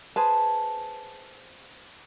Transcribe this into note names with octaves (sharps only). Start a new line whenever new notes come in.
G#4 B4 C5 A5